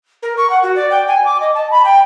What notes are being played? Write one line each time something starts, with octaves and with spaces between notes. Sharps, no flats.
A#4
C#6
F#5
F#4
D5
G5
G#5
D6
D#5
A5
B5
G5